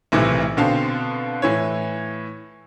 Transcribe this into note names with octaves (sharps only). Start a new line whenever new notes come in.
B1 A2 C3 D#3 E3
B2 D3 C4 F5 A5
A2 E3 C#5